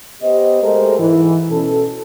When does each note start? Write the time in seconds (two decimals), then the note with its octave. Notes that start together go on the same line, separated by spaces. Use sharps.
0.22 B3 G4 C5 D#5
0.62 G#3 A3 G4 A4 A#4 C5
1.00 G#2 E3
1.50 B2 C#4 A4